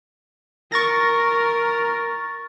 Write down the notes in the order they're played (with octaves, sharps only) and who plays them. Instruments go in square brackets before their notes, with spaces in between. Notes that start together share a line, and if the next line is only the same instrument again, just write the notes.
[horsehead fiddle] A#4 [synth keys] C#6 A6 A#6